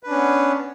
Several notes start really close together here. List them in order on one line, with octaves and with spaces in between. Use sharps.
B4 D4 C#4 B3